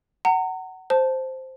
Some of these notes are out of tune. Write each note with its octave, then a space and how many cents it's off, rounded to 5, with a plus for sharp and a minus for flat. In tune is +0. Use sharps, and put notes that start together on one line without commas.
F#5 +20 A#5 -30
C5 +0 A5 +0